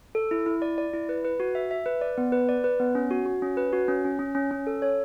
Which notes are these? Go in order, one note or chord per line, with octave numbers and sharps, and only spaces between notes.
A4
E4
E4
D5
D5
E4
B4
B4
F#4
E5
E5
B4
D5
B3
B4
D5
B4
B3
C#4
F#4
F#4
C#4
B4
F#4
C#4
C#4
C#4
C#4
C#4
A4
C#5